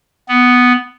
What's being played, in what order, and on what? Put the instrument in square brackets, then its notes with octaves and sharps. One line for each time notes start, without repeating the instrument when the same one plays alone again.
[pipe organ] B3